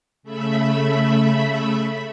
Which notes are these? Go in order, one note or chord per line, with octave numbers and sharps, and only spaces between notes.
C#3 A3 E5 B5